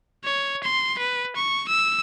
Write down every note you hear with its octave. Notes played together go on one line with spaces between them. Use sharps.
C#5
C6
B4
C#6
E6